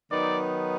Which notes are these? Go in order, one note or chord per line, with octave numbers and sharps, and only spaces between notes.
D#3 F#3 B3 D#4 D5